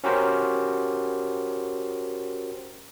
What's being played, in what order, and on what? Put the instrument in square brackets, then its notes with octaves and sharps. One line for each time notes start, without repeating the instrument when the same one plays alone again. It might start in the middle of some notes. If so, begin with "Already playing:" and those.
[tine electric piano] C#4 F#4 G4 A#4 C5